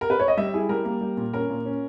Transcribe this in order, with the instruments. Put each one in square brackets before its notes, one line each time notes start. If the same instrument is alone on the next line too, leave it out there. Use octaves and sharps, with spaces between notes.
[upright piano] A#4
B4
C#5
D#5
G3 E5
E4 G#4
G3 A#4
A#3
G3
A#2
C#4 A#4
A#2
C#4